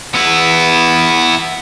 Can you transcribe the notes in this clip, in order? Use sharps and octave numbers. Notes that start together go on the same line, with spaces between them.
B3 E4